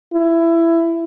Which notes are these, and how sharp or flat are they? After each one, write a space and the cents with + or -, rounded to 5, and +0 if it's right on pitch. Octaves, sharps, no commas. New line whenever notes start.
E4 +15